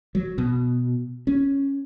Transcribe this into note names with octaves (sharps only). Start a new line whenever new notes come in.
F#3
B2
C#4